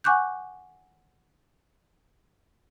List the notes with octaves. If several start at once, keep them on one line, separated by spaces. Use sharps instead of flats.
F#5 G#5 C#6 D6 F#6 G6